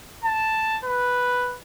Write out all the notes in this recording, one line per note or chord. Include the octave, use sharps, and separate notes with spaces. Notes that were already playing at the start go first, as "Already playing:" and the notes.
A5
B4